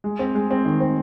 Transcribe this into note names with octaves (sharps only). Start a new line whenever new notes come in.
G#3
C4
G#3
C4
D#3
C4